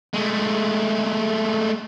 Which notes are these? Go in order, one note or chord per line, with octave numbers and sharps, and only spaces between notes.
G#3 A3